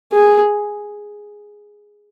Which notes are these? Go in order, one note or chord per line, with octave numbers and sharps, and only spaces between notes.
G#4